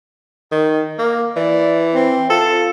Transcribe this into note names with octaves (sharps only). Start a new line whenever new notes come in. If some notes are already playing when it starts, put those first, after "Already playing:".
D#3
A#3
E3 D5
C4
F4 A4